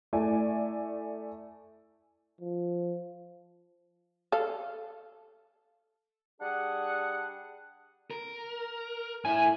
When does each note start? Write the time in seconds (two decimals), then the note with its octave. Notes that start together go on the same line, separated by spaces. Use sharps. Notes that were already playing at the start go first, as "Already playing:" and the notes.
0.13 A3 E4 D5 E5 G#5
2.41 F3
4.32 A4 F5
6.40 G3 D4 G#4 F#5
8.11 A#4
9.25 A2 E4 G#5